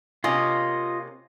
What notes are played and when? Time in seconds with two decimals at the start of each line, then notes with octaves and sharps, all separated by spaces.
0.24 C3 A#3 C#4 F4 D#5